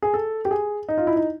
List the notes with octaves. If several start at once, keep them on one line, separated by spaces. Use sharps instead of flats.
G#4
A4
G4
G#4
D#4
F4
E4
D#4